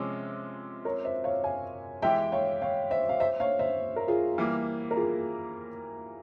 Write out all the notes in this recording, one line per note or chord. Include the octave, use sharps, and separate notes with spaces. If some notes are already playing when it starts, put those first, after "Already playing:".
Already playing: C3 F3 G#3 C#4
A#4 C#5
C5 E5
C#5 F5
F5 G#5
E3 G#3 E4 G4 E5 G5
C#5 F5
C#5 F5
C5 E5
F5
C5 E5
C#5 F5
C5 E5
A#4
F4 G#4
E3 G3 A#3
A#4
F4 G#4